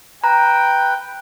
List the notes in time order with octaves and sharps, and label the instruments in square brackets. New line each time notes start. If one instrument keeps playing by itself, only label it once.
[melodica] B4 [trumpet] G5 [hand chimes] A#5